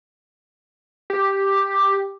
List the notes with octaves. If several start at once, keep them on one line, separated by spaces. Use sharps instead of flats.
G4